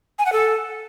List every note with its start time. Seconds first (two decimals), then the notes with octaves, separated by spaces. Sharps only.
0.19 G#5
0.26 F#5
0.33 A4